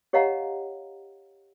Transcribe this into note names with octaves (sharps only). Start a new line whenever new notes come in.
G4 C#5 D#5 F5 F#5 A#5